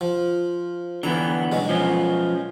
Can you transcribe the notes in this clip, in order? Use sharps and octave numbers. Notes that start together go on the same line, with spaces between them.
F3
D3 E3 B3 A#5
B2 F#3 G#3
F3 C#4